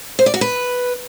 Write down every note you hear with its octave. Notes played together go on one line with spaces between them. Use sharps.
C5
D5
F#4
B4